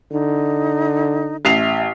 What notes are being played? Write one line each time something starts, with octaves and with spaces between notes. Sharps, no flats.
D3 D#4
A1 E5 C7 F7